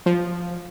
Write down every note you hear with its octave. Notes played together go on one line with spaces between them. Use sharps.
F3